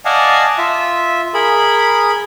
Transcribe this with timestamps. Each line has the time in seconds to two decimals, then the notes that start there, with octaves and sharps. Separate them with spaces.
0.05 D5 D#5 F5 F#5 G#5 A5
0.58 F4 E5
1.34 G#4 A#4 B5